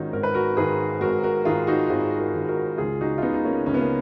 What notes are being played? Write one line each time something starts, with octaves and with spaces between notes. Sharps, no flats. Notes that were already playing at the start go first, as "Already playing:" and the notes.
Already playing: G#1 G#2 D#3 C#4 D#4 F4 F#4
G#1 A#4
B4
F#4 A#4
G#2 D#3 G#4 B4
G#1 F#4 A#4
F#4 A#4
G#2 D#3 F4 G#4
D#4 F#4
G#1 F4 G#4
F#4 A#4
G#2 D#3
F#4 A#4
C#2 F4 G#4
D#4 F#4
F4
C#3 B3 D#4
D#4
A#3 C#4
C#2 C#4
B3
A#3